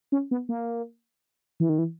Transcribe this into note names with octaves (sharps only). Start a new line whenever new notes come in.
C#4
B3
A#3
E3
D#3
E3